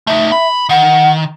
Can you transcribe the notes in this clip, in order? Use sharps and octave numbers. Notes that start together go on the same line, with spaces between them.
A3 D#4 E5
B5
D#3 F#5